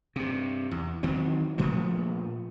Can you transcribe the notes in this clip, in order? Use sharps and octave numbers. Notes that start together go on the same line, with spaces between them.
G2 C3
E2
D#3 E3 F#3 C4
A#2 F3 A3 B3